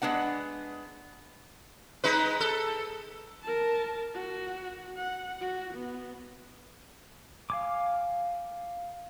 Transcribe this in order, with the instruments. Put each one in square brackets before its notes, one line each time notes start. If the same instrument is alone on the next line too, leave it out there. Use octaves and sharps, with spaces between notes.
[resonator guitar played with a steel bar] G#3 B3 D4 F#5
[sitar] G#3 D#4 B4
A4
[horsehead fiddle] A#4 A5
F#4
F#5
F#4
B3
[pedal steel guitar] F5 G#5 D6